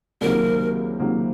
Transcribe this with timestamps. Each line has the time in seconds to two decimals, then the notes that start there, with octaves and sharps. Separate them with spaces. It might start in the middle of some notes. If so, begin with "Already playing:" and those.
0.21 C#2 C3 D#3 F#3 A#3 A#4
1.00 C#2 C3 D#3 F#3 A#3